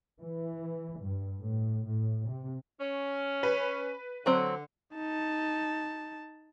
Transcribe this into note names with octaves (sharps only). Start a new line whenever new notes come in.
E3
G2
A2
A2
C3
C#4
B4
D3 F#3 C4
D#4 A5